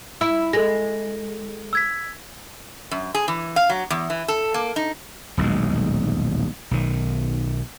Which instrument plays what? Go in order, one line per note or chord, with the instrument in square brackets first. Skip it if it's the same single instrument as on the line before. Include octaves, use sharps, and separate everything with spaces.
[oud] E4 [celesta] E6
[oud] G#3 [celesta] A4 A#6
[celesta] E6 G#6 B6
[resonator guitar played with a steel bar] F#2
G#4
E3
F5
F#3
E2
E3
A4
A#3
D#4
[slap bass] D#1 B1 E2 G#3
B1 D#3